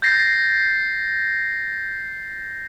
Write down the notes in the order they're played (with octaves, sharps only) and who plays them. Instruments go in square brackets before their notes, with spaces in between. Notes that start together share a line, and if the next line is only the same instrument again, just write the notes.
[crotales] G6 A6 A#6 C7